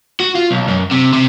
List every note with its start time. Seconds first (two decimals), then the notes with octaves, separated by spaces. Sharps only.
0.20 F#4
0.35 F4
0.51 B1
0.68 F#2
0.91 C3
1.13 C3